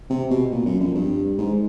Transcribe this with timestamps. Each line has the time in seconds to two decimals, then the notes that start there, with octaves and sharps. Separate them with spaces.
0.10 C3
0.31 B2
0.52 A#2
0.66 F#2
0.80 F2
0.95 G2
1.38 G#2